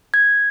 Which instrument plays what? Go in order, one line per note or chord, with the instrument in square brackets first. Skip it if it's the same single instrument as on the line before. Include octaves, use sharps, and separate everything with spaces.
[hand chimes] G#6